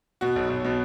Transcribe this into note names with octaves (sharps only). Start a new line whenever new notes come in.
B2 F#4
B1
B1
B2